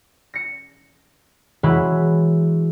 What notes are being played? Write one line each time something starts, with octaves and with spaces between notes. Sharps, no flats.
A#6 C#7
E3 F#3 G#3 E4 B4